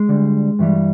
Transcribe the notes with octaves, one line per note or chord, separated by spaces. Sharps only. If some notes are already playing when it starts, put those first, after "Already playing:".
Already playing: G#3
D2 D3 G3
G2 E3 G3